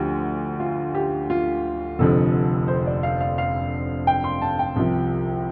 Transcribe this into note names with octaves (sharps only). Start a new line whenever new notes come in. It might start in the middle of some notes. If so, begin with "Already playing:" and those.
Already playing: D2 D3 F3 G4
F4
G4
F4
F1 F2 D3 F3 A4
C5
D5
F5
F5
F5
G5
C6
A5
G5
C2 C3 F3